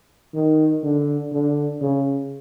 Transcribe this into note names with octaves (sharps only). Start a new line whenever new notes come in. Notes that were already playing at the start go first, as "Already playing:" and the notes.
D#3
D3
D3
C#3